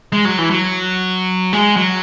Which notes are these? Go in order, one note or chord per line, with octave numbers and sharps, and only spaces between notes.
G#3
F#3
E3
F#3
G#3
F#3